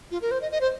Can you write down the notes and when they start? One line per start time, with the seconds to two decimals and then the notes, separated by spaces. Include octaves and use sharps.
0.11 F4
0.22 A#4
0.31 C5
0.41 D#5
0.52 D#5
0.61 C5